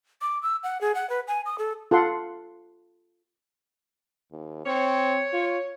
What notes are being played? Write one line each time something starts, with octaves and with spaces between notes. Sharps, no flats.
D6
E6
F#5
G#4
F#5
B4
G#5
D#6
A4
F4 A4 F#5 C6
D#2
C4 C#5
F4